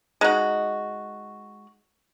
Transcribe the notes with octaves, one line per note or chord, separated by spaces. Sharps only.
G#3 D#4 F#4